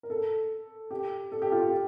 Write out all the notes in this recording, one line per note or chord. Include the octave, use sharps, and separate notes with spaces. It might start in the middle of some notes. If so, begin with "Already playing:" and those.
A#4
A4
G4
A4
G4
F4
G4